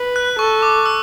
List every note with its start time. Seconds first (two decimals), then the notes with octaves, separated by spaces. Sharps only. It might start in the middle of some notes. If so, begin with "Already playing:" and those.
Already playing: B4
0.16 F#6
0.39 A4 C#6
0.62 D6
0.86 E6